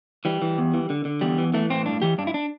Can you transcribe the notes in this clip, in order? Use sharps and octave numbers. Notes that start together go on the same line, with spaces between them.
E3 G3
E3
E2
E3
D3
D3
E2 G3
E3
E3 A3
A2 C4
G2 D4
E3 G4
G2 D4
E4
D4